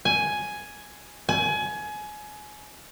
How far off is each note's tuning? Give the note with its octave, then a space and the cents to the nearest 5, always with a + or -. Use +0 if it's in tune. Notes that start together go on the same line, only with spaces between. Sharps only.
G#5 +5
G#5 +25